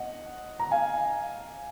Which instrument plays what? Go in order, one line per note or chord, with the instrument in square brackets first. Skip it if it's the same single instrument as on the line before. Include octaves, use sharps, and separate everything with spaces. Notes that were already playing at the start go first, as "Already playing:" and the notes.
Already playing: [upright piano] D#5 F#5
A#5
F5 G#5